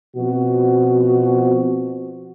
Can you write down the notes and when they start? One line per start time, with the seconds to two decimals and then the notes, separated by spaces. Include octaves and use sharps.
0.17 B2 F3 C4 F#4